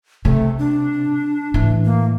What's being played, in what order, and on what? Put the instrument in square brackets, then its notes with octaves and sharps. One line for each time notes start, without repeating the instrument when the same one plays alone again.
[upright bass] C3 [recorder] A3
[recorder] D4
[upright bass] A2 E3
[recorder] A#3